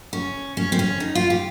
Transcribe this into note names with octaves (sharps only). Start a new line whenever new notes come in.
C#4
C#4
C4
C#4
D#4
F4
G4